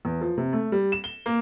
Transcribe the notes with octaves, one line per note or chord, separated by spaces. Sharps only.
E2
F3
C3
A3
G3
E7
G7
A#3